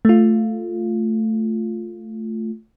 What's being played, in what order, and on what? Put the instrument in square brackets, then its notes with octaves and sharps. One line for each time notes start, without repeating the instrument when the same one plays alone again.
[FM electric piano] A3 F4